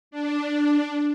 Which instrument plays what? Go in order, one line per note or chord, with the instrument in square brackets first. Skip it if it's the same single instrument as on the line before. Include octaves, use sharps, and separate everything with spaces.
[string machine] D4